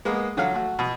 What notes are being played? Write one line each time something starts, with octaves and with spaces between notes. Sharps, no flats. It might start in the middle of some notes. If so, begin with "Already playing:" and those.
G#3 A#3 B3
D3 F#3 F#4 F5 F#5
A3 F#4
B2